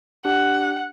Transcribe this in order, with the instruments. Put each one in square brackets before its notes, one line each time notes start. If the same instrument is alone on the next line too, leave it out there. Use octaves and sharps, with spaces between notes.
[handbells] D4 G4 [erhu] F#5